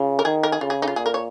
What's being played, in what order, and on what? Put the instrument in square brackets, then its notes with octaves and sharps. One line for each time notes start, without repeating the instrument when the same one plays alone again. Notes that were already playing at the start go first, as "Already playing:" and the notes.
Already playing: [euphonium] C#3 [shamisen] F4
[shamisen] A#4
[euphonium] D#3 [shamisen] G#4
[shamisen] A#4
G#4
[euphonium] C#3 [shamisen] F4
[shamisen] G#4
D#4
F4
[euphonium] A#2 [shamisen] G#4
[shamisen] A#4
C#5